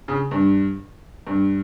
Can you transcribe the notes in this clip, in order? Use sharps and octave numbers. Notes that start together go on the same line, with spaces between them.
C#3
G2
G2